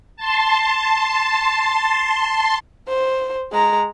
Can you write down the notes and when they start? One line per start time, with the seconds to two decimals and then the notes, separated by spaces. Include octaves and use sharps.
0.16 A5 C6
2.88 C5
3.52 G#3 A#5